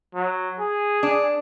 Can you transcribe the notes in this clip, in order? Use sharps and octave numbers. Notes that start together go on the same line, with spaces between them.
F#3
G#4
D4